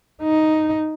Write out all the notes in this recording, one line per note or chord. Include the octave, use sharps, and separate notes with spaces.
D#4